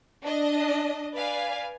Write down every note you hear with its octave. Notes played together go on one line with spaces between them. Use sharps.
D4 D#5
B4 D5 F5 G#5